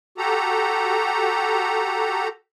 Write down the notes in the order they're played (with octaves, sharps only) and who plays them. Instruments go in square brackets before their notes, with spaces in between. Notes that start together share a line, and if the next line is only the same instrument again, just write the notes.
[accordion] F#4 G4 A4 A#5